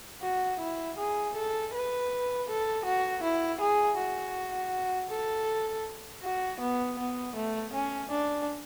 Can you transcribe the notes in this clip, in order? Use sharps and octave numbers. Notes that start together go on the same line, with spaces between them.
F#4
E4
G#4
A4
B4
A4
F#4
E4
G#4
F#4
A4
F#4
B3
B3
A3
C#4
D4